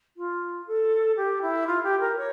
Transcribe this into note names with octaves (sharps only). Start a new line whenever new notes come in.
F4
A4
G4
E4
F4
G4
A#4
C#5